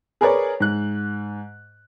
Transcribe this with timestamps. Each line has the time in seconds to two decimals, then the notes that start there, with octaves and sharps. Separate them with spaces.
0.21 G#4 A#4 B4 C#5 D5
0.60 G#2 F#6